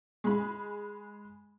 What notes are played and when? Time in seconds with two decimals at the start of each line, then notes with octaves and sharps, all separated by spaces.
0.24 G#3 B5